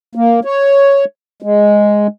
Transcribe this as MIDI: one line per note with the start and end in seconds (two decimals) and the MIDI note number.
0.15 0.40 58
0.45 1.05 73
1.42 2.07 56